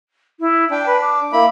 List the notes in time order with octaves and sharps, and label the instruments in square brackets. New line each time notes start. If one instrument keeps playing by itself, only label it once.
[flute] E4
[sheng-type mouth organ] D4 [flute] G5
[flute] B4
D6
[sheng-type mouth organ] A#3 E4 B5